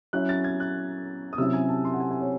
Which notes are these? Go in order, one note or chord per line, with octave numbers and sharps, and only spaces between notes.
F#3 C#4 E4 F#6
A6
G#6
F#6
D#6
C3 F#3 C#4 E4 E6
G#5
A5
C6
F#5
G#5
G#5
C#5